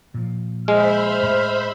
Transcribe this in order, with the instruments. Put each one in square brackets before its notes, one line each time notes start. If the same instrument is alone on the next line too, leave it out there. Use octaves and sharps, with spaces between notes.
[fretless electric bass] A#2 F3
[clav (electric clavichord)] G#3 [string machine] C5 E5 B5 [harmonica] F6
[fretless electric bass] A2 A3